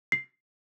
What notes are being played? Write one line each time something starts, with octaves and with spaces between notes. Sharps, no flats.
C7